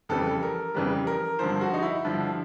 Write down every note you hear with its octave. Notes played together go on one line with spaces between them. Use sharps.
F2 C#3 E3 G3 A4
A#4
F2 C#3 E3 G3
A#4
G2 D3 F3 C5
F#4
D#4
E4
G2 D3 F3